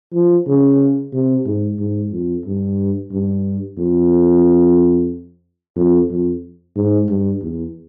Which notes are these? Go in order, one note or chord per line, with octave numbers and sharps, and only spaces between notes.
F3
C#3
C3
G#2
G#2
F2
G2
G2
F2
F2
F2
G#2
G2
E2